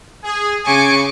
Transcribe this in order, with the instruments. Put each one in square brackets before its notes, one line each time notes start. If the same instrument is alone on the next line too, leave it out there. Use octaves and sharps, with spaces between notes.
[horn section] G#4
[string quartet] C#3 C#6 D6 [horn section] G#5